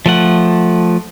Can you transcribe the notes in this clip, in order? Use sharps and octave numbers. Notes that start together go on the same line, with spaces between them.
F3 A3 F#5